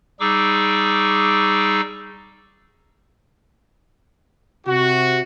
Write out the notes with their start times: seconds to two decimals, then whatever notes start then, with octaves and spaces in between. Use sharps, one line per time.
0.20 G3 D#4 G#4 C#6 D6 E6
4.67 C3 F#4